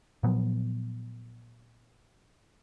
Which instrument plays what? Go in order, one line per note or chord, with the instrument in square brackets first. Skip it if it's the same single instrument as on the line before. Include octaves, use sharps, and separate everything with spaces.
[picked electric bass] A#2 F3 F#3 B3